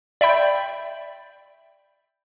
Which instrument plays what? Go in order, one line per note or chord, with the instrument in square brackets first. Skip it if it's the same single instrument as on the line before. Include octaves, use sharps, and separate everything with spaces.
[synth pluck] D5 E5 G5 B5 G6